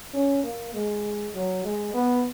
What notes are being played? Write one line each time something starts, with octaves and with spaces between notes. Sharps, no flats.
C#4
A#3
G#3
F#3
G#3
B3